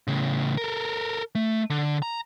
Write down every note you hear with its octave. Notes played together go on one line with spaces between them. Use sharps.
A2 C#3
A4 A#4
A3
D3
A#5